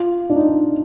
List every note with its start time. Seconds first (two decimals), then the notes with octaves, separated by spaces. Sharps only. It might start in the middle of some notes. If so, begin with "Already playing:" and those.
Already playing: F4
0.30 D4
0.36 D#4